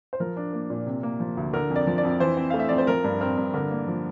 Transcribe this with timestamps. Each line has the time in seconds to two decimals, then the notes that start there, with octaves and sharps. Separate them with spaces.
0.13 C5
0.20 F3 A#4
0.37 D4
0.53 A#3
0.70 A#2
0.87 C3
1.03 A#3
1.20 F3
1.37 D2
1.53 D3 A#4
1.70 F2
1.76 D5
1.87 F3
1.98 D5
2.04 F2
2.20 E3 C5
2.37 C4
2.50 A3 F5
2.59 E5
2.69 F2 D5
2.78 C5
2.87 F3 A#4
3.04 G2
3.21 C4 A#4
3.37 G2
3.54 D3 A#4
3.71 A#3
3.88 F3